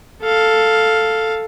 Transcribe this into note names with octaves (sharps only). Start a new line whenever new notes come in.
A4 F5